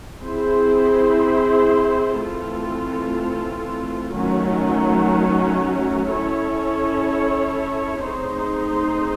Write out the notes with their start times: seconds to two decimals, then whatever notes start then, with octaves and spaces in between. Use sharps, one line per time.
0.22 C4 E4 G#4 C5
2.17 E3 A3 C4 F4 A4
4.12 D#3 F#3 A3 C#4 F#4
6.08 C#4 E4 A4 C#5
8.03 A3 C4 D#4 G#4 C5